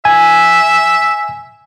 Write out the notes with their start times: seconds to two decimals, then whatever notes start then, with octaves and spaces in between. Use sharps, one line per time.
0.05 E5 G#5